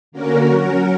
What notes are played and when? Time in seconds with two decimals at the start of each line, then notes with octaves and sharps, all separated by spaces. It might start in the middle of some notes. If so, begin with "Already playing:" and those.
0.12 D3 A#3 C#4 F#4 A#4
0.46 F#3 C#4 F#4 A#4